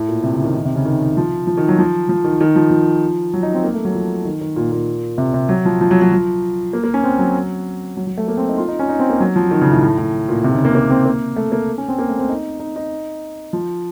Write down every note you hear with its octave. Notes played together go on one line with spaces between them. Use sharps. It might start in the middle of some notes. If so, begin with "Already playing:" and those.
Already playing: A2
A#2
C3
C#3
D#3
D#3
C3
C#3
D#3
D#3
F3
F3
D#3
F#3
F3
F3
D#3
D#3
F3
F3
F#3
D#4
C4
A#3
A3
F#3
F3
D#3
D#3
A#2
A#2
C3
C3
F#3
F3
F3
F#3
F#3
F3
A#3
A#3
C#4
C4
F#3
F#3
F#3
A3
A#3
C4
D#4
F4
D#4
C#4
D#4
C4
A#3
F#3
F3
D#3
C#3
A2
A2
A2
A#2
C3
D#3
C#3
A#3
A#3
C4
A#3
A3
A#3
C#4
C4
A#3
A3
C4
D#4
D#4
D#4
F3